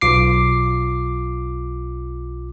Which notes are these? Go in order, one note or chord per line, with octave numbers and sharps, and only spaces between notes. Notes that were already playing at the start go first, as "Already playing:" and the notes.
B1 F4 D6 C7